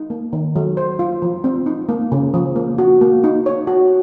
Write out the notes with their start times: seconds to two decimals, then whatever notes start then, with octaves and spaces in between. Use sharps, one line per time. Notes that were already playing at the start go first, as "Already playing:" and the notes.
Already playing: D#4
0.10 A#3
0.33 D#3
0.56 F#3
0.77 C5
0.99 F4
1.22 F3
1.44 C4
1.66 D#4
1.89 A#3
2.12 C#3
2.34 F3
2.56 A#3
2.78 F#4
3.01 A#3
3.24 D#4
3.46 C#5
3.67 F#4